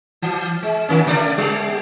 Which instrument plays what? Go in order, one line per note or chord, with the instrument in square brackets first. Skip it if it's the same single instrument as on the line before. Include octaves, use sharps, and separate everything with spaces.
[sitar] E3
G#3
D#3 A#3 C#4
C#3 A3 D5
G3